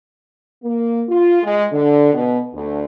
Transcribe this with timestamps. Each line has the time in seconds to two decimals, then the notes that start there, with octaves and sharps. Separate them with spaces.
0.64 A#3
1.09 F4
1.43 G#3
1.72 D3
2.13 B2
2.54 D2